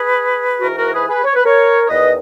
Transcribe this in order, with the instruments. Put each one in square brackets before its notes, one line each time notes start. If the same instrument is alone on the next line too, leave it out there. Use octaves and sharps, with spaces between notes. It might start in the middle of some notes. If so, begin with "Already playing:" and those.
Already playing: [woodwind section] G#4 B4
G#2 E3 F#4 A#4
F#4 A#4
G#4 B4
G#4 B4
C#5
B4
A#4 C#5
C#5
E2 D#3 B4 D#5